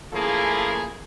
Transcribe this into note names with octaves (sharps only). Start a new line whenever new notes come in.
C#3 F3 A3 A#3 E4 G#4